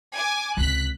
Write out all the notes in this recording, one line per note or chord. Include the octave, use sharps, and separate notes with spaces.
G#5 D6
C#2 C3 F#6 B6